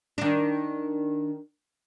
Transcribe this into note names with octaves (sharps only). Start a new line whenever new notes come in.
D#3 D4